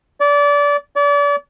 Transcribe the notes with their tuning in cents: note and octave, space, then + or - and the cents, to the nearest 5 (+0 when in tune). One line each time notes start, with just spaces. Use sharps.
D5 -25
D5 -35